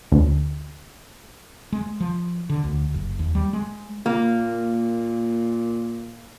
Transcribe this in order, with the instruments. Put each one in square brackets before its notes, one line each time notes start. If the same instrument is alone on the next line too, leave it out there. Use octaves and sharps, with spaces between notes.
[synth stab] D2
[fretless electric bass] G#3
F3
D3
D2
F#1
D#2
G3
G#3
[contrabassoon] A#2 [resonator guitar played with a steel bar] A#3